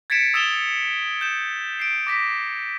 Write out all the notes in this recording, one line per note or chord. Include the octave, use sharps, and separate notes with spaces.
G#6 A6 B6 C#7 D7 E7
D#6 E6 A6 E7 F7 G7
G6 E7
C7 D7
D6 A#6 B6 D7